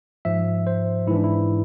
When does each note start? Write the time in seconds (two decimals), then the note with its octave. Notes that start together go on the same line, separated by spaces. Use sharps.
0.25 G#2 F3 E5
0.67 C5
1.07 G#2 E3 E4
1.15 D4
1.24 E4